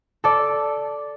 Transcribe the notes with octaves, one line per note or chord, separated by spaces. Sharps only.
A4 D5